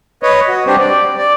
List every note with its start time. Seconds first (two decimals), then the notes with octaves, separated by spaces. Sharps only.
0.23 B4 C#5 D#5
0.48 F#4
0.67 G3 C4 D4 G4 C5
0.80 D5
1.18 D5